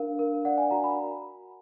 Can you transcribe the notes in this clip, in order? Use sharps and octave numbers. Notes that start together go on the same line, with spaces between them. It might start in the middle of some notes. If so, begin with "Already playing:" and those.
Already playing: D4 A#4 F5
A#4
D5 F#5
G#5
F#4 A#5
B5